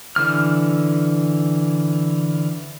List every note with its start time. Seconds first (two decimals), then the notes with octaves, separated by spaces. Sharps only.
0.16 D3 E3 F6